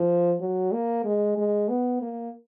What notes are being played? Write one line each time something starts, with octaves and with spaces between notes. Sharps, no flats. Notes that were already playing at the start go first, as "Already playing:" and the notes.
Already playing: F3
F#3
A#3
G#3
G#3
B3
A#3